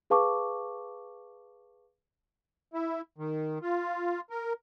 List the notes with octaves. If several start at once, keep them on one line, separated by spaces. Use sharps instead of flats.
G#4 B4 F5 A5 C#6 D6
E4
D#3
F4
A#4